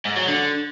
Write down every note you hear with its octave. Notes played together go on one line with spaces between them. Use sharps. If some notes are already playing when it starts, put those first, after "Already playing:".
G#2
F#3
D3